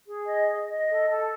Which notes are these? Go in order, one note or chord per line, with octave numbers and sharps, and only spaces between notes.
G#4
D#5
D#5
D#5
A4
A4